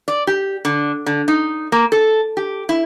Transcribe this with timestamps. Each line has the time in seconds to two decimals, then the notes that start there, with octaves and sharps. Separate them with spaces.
0.08 D5
0.27 G4
0.65 D3
1.06 D3
1.28 D#4
1.72 A#3
1.92 A4
2.37 G4
2.69 E4